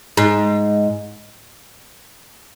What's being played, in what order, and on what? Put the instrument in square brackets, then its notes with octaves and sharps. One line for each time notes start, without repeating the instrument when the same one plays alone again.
[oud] G#2